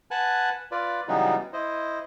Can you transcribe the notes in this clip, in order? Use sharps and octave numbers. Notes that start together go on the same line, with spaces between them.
B4 F#5 G#5 A5 F#6
F4 B4 D5
C#3 E3 F#3 G3 B3 D#4
E4 C5 D#5